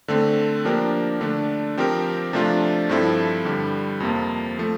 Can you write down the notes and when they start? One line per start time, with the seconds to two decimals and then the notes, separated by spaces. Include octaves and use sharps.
0.08 D3 A3 C4
0.65 F3 A#3 D4 G4 A#4
1.21 D3 A3 D4
1.77 F3 C4 G4 A#4
2.33 C3 F3 A3 D4 F4
2.89 G2 F3 C4 E4 A4
3.45 G2 D3 G3
4.00 F2 C3 F3 A#3 F4
4.59 F3 A3